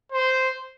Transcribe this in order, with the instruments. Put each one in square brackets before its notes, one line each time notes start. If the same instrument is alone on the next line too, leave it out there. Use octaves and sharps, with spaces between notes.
[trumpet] C5